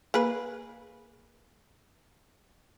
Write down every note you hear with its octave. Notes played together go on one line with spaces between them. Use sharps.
A#3 G#4 B4